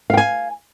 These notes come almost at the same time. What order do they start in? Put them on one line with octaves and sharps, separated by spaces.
F5 G5 G#5